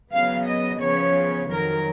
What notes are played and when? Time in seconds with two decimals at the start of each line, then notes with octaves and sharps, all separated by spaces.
0.12 C#3 F#3 B3 F5
0.47 D#5
0.81 C#3 F3 B3 C#5
1.50 F2 D#3 F#3 A#4